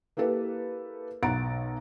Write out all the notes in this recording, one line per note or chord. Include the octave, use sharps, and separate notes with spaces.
A#3 E4 G4 A4 B4
B1 F#5 A#5 A6 D7